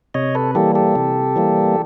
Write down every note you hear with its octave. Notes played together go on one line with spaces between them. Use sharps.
C3 C#5 D#5
A4 B4
E3 G3 A#3 G4 A4
G4 A4
C3
E3 G3 A#3